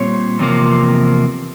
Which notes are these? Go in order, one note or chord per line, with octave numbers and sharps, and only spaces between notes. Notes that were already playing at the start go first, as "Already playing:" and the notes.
Already playing: A#2 G3 C4 C#5
E2 C3 F3 A#3